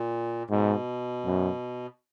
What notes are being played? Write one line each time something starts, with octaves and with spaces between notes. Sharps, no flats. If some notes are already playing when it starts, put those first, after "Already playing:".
Already playing: A#2
G#2 B2
F#2